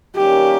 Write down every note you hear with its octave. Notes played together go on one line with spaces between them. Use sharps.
D#3 G3 A#3 C#4 G4